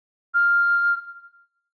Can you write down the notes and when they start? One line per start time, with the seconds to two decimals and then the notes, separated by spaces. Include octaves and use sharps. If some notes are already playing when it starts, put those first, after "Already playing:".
0.34 F6